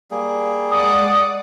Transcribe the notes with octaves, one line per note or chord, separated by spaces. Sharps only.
G3 A#3 G#4
G#3 D5 F#5 D#6